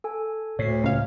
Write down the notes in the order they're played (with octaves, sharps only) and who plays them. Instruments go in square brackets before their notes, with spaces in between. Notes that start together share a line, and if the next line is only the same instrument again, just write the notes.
[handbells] A4 G#5
[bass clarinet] D2 [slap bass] A2 [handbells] C#5 C7
[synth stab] C#2 F5